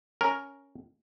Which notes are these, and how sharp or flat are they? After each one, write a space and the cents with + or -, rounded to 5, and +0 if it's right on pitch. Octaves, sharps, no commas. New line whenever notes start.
C#4 +5 A#4 +0